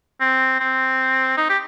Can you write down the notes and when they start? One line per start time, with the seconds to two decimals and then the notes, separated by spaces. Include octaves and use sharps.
0.21 C4
0.60 C4
1.37 D#4
1.50 G4